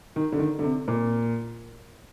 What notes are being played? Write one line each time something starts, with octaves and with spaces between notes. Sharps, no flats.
D#3
D3
D#3
D3
C3
A#2